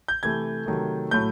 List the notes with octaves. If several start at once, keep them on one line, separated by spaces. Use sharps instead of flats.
G6
C3 E3 A3 G#6
C3 D#3 F#3 A3
A2 F#3 A3 G6